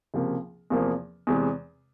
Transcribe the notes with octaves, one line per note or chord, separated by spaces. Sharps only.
C#2 C3 F3 A#3
E2 C3 F3 A#3
E2 C3 E3 G#3